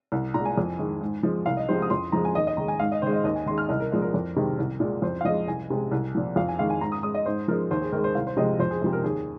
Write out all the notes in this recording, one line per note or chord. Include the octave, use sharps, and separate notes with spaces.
C2
A#2 G#3 A#5
G#5
F2
D#3 G#3
G#2
F3 G#3
C2 F5
D#5
C3 F3 G#3 C5
D#6
F2 C6
F3 G#3 A#5
G#5
D#2 D#5
D#5
D#3 G#3 A#5
G#5
G#2 F5
D#5
D#3 G#3 C5
D#5
D#2 D#5
G#5
D#3 G#3 C6
F6
C2 D#5
A#4
A#2 F3 G#3
A#4
F2
C3 D#3 G#3
C2
A#2 G#3
F2 C5
F5
F3 G#3 D#5
C2 G#5
C3 G#3
C2
A#2 F3
F2 F5
G#5
D#3 G#3 F5
G#5
G#2 A#5
D#6
G#3 D#6
D#5
G#2 C5
F3 G#3 A#4
D#2 C5
G#4
D#3 G#3 A#4
C5
C2 F5
C5
C3 F3 G#3 D#5
F2 C5
G#4
C3 F3 G#3 G#4
A#4
D#2 G#4